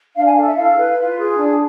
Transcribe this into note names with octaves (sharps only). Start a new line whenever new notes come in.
D4 F5
G#5
A4 F5
E5
E4 F5
B4
F4
G#4
D4